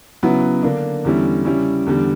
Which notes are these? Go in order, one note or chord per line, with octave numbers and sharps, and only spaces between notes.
C#3 F#3 B3 E4
D3 A#3 D4
E2 D3 G3 C#4 E4
C#3 G3 C#4 E4
E2 D3 G3